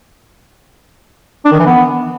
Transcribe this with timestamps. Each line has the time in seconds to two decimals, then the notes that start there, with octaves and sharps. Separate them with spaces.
1.45 D4
1.52 D#3
1.59 E3
1.66 B3